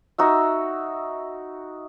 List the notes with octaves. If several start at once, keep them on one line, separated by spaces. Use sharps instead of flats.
D#4 F#4 E5